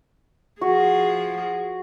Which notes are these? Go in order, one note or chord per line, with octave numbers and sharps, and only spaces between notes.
F3 F#4 G#4